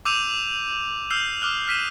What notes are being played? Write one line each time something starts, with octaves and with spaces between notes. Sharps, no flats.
D6 E6 G6 D#7 F7
E6 F6 G6 C7 F7
D6 D#6 F6 F#6
F6 B6 D#7 E7